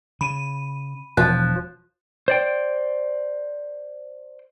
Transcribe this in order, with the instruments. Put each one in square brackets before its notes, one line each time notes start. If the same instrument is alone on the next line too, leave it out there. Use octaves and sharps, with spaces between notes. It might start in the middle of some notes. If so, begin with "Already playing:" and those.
[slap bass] C#3 [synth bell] B5 D#7
[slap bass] E1 [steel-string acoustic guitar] F3 [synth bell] F#6
[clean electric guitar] C5 D5 G5